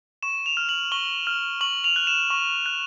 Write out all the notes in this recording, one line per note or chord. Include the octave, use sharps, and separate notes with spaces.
C#6 E7
F7
F6
F#7
C#6 G7
F6
C#6 F#7
F7
F#6
E7
C#6
F#6